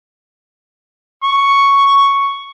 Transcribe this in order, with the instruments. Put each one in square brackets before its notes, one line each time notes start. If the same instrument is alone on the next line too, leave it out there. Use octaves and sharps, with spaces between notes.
[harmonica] C#6